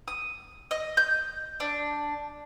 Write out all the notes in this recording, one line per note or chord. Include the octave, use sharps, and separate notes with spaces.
D#6
D#5
G6
D4